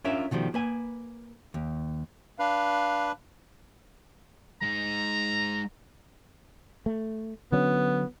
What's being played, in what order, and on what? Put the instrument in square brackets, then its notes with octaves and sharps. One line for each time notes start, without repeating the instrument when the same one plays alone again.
[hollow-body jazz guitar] C#4 D4 F4 A#4 C#5 E5
B2 D#3 F3 G3 A3
A#3 B4 G#5
D#2
[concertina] D4 B4 [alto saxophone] F5
[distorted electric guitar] G#3 D#4 [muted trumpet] A#5
[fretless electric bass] A3
[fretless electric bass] D3 F#3 C#4 [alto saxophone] B3